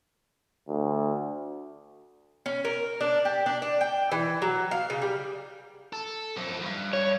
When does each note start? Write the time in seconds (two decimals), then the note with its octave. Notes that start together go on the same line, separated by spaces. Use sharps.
0.68 D2
2.46 C#4
2.65 A#4
3.01 D4
3.25 G4
3.46 D4
3.62 D4
3.81 G5
4.12 E3
4.42 F#3
4.71 F5
4.90 C#3
5.02 G3
5.93 A4
6.37 F#2 F3
6.62 E2 G2
6.93 C#5